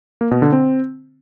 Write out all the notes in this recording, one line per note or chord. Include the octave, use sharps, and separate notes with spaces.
A#3
B2
D3
C4